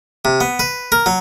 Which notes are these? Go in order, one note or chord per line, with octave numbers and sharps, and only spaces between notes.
C3
B3
B4
A#4
F#3